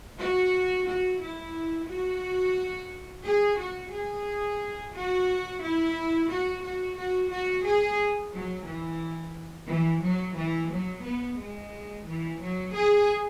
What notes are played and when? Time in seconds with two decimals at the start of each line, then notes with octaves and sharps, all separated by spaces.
0.19 F#4
0.86 F#4
1.20 E4
1.88 F#4
3.24 G#4
3.59 F#4
3.91 G#4
4.94 F#4
5.62 E4
6.30 F#4
6.63 F#4
6.97 F#4
7.31 F#4
7.65 G#4
8.33 F#3
8.67 E3
9.69 E3
10.03 F#3
10.37 E3
10.71 F#3
11.05 B3
11.39 G#3
12.06 E3
12.41 F#3
12.75 G#4